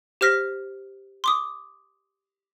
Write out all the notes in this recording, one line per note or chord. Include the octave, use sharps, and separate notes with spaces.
G4 C5 F6 A#6 B6
C6 D6 D#6